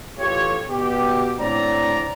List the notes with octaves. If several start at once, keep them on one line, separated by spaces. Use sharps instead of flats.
A1 F4 G4 A4 C#5
B2 G4
A2 D3 C4 D5 A#5